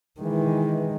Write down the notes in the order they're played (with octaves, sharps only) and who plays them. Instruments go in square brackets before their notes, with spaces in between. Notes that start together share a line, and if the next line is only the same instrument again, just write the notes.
[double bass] D#3 G#3 [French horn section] E3